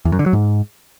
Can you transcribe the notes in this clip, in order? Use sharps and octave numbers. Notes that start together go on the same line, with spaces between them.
E2
F#2
D3
F#3
G#2